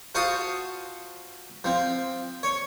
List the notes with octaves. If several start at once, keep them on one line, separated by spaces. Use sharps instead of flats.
F4 F#4 C5 F5 A5 D#6
F3 C4
C#5